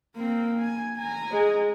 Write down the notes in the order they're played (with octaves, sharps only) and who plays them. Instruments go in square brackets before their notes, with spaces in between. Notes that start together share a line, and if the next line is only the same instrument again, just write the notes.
[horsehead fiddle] A#3 C4
G#5
G#5 A#5
[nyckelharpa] G#3